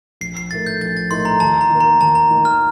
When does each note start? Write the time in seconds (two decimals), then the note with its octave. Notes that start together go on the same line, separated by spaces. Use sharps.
0.21 A#1 C7
0.37 C7
0.51 A2 A3 D#4 A#4 A6
0.66 G6
0.81 A#1 A6
0.97 A6
1.11 A2 A3 D#4 A#4 C6
1.25 A#5
1.40 D#2 A5
1.61 A#5
1.70 D#3 A#3
1.80 A#5
2.01 D#2 A5
2.15 A#5
2.31 D#3 A#3
2.45 F6